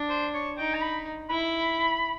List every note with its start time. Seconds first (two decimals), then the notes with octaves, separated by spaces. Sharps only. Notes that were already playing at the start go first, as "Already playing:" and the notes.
Already playing: D4
0.10 C5
0.34 C#5
0.58 D#4 G5
0.74 A#5
0.82 B5
1.30 E4 B5